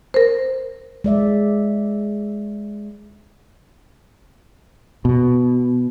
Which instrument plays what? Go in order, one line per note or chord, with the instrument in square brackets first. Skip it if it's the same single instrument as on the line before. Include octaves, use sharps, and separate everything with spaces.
[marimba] A#4 C5
[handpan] G#3 D5 E5
[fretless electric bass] B2